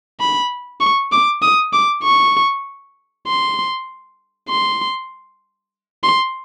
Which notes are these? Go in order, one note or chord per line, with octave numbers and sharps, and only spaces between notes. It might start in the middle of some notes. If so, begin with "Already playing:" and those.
B5
C#6
D6
D#6
D6
C#6
C6
C6
C6